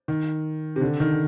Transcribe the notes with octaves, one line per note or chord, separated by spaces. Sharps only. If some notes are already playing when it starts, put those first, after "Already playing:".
D#3
C3
D3
D#3